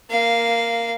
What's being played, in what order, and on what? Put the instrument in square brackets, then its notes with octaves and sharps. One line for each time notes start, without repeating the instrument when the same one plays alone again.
[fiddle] A#3 F5